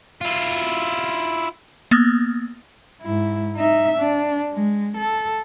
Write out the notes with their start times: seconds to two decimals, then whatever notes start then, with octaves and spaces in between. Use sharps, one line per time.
0.21 E4 F4
1.91 A#3 B3 D#6 F6 A6 A#6
3.02 G#2 E4
3.56 D#4 E5
3.98 D4
4.53 G#3
4.97 A4